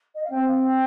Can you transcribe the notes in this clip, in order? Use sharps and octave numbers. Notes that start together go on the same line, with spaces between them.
D#5
F5
C4 G5
F5
G5